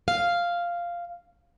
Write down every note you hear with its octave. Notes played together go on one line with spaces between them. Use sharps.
F5